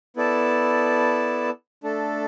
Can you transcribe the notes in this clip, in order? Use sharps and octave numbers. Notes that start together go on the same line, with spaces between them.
B3 E4 A4 D5 A5
A3 D4 A4